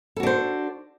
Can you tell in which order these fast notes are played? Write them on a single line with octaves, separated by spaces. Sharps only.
A4 F#4 D4 C5